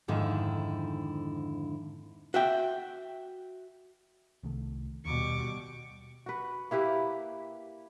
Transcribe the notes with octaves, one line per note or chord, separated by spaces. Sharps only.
F2 G#2 D3 D#3 E4
F#4 E5 G5
C2 D#3 A3
D#2 B2 G3 C#6 D6
F#4 B4
A#3 E4 G4 B4